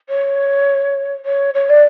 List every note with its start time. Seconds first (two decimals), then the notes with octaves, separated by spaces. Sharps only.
0.09 C#5
1.26 C#5
1.54 C#5
1.70 D5